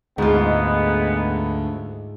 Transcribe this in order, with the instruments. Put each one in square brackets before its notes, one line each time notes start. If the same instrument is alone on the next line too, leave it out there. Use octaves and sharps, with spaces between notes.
[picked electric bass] D2 [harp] G#2 F4 [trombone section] G#3 B3 D#4